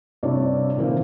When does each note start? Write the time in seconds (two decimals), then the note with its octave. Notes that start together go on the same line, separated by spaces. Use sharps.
0.23 G2 C3 E4 C#5 D5
0.77 A#2 D#3 E3 A#3 C4 A#4